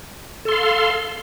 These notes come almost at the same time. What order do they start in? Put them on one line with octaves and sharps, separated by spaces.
A4 C6 F5